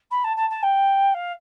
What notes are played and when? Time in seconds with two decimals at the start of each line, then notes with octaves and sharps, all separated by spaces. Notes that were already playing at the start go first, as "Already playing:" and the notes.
0.11 B5
0.24 A5
0.36 A5
0.50 A5
0.62 G5
1.14 F5